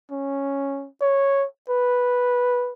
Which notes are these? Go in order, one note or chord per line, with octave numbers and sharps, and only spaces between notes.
C#4
C#5
B4